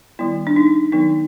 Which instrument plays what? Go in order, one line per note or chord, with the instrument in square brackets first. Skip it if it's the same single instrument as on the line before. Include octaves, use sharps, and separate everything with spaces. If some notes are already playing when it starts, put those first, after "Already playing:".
[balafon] D#3 G3 B3 E4
D4
D#4
D#3 F#3 B3 D#4